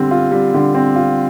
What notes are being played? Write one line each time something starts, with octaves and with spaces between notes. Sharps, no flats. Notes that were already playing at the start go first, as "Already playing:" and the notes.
Already playing: D3 G3 C4
F4
G3
D3
C4
F4